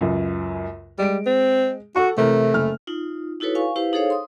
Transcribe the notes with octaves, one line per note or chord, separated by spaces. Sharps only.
C#2 F#2
G3 G#3 D7
C4
F#4 A4 F#5 C#6
C3 E3 A3 A#4
F#1 F6
D#4 F4
D#4 E4 F#4 A4 B4 C#5
F5 G#5 C#6
E4 G4 B4 C5 F5
D#4 G#4 A4 C5 C#5 F5
C6 D#6